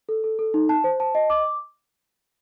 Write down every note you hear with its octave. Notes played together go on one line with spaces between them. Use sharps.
A4
A4
A4
D#4
A5
C5
A5
D#5
D6